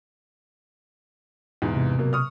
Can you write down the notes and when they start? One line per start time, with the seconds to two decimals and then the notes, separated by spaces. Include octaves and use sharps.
1.62 E2 G#2 B2
1.75 C3
1.98 B2 F#3 A#3
2.13 C#6 D#6 F6